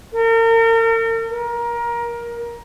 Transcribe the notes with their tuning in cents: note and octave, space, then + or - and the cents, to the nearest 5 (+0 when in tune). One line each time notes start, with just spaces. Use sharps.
A#4 -40
A#4 +20